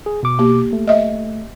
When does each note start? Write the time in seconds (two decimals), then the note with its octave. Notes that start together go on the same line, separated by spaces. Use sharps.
0.06 G#4
0.23 B2 D6
0.39 A#3 G4
0.73 A3
0.87 D#5 E5